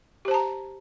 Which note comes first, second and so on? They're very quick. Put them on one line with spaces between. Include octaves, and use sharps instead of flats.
G4 C5 A5 A#5